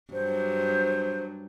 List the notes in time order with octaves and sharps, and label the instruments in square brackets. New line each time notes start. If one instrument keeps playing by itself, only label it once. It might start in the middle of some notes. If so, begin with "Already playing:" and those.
[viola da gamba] G2 F#3 [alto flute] C5